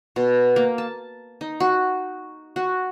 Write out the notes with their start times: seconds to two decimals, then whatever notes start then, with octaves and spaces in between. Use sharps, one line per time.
0.16 B2
0.56 A#3
0.78 A5
1.41 D#4
1.60 F#4
2.56 F#4